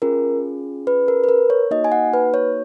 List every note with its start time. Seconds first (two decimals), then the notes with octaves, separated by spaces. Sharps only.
0.02 C#4 F4 G#4 A#4
0.87 B4
1.08 A#4
1.24 B4
1.29 A#4
1.50 C#5
1.71 A#3 D#4 F#4 D#5
1.84 G#5
1.92 F#5
2.13 B4
2.34 C#5